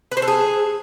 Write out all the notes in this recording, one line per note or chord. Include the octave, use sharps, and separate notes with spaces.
B4
C5
A4
G#4